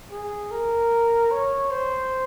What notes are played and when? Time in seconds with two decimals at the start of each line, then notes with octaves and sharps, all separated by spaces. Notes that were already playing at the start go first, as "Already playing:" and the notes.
0.11 G#4
0.51 A#4
1.31 C#5
1.71 C5